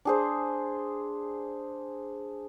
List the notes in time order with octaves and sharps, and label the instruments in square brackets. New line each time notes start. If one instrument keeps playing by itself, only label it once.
[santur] D4 G#4 C5